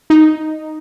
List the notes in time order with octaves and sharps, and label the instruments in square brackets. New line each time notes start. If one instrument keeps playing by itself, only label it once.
[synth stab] D#4